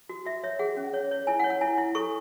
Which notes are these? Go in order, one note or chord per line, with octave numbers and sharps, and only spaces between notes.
F#4
F#4 E5
C#5 E5
G#4 F#5
C#4
C#5
C#5
E4 G#5
F#5
C#5
F#5
E4 G#5
E4
A4 C#6